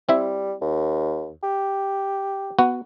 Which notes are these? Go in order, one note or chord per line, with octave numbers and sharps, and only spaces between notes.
G3 C4 E4 E5
D#2
G4
B3 F#4